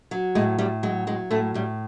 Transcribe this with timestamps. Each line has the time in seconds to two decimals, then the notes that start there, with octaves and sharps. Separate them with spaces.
0.11 F#3
0.35 A2 G#3
0.59 A2 G3
0.83 F#3 G#3
1.07 F#3 G#3
1.31 A2 A3
1.54 A2 G3